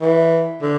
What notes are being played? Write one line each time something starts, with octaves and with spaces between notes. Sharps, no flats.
E3
D3